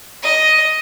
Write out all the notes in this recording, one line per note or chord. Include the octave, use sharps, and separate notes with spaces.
D#5